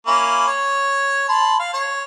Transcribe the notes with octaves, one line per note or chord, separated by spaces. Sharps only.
A#3 C#4 E4
C#5
A5 B5 C6
F5
C#5